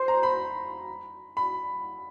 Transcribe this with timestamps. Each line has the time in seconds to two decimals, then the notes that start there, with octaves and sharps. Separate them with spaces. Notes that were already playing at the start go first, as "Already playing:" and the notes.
Already playing: C5 C6
0.08 A#5
0.23 B5
1.37 B5